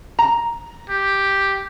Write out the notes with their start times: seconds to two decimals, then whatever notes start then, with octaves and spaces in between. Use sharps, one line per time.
0.19 A#5
0.89 G4